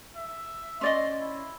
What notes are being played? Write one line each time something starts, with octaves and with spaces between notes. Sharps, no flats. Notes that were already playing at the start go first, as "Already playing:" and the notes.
E5
C#4 D5 D#5 C6
E4